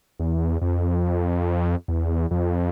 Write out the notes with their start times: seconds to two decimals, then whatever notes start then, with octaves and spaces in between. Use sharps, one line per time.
0.20 E2
0.62 F2
1.88 E2
2.31 F2